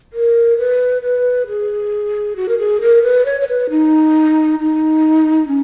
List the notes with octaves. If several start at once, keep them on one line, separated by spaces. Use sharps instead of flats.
A#4
B4
B4
G#4
F#4
A#4
G#4
A#4
B4
C#5
C#5
B4
D#4
D#4
C#4